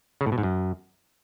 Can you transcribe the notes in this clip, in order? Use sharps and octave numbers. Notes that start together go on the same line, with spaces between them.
C#3
A2
B2
G#2
F#2